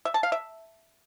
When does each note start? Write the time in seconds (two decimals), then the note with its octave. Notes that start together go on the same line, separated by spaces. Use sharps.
0.05 E5
0.14 A5
0.23 F5
0.32 E5